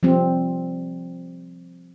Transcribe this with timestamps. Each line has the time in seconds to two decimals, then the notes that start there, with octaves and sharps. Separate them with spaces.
0.03 F3 G3 C4